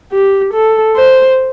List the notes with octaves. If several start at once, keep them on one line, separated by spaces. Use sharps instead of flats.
G4
A4
C5